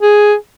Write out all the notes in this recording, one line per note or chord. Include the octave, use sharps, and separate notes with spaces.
G#4